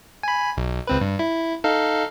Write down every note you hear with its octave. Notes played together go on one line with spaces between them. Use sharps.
G#5 B5
B1
C#2 C4 B4
G2
E4
D#4 A4 F5